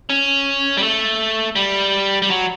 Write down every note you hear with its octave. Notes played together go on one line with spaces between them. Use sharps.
C#4
G3
A3
G3
G3
F#3